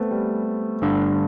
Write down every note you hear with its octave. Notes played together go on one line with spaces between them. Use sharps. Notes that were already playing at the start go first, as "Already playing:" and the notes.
Already playing: A3 B3 C4
G3
G1 G2 D3